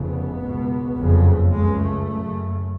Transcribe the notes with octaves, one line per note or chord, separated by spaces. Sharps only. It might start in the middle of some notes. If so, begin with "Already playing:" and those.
Already playing: F1 F2 C#3 B3
C#2 B2
F#1 F2 C#3
C#2 C#3 G#3
A3
F#1 F#2 C#3